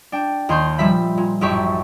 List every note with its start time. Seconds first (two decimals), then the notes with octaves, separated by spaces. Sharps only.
0.12 D4 G5
0.49 D#2 D#3 C6 G6
0.78 A#2 F3 G3 E5 B5
1.17 A#2
1.41 A1 F#2 D#4 G4 E5 C#6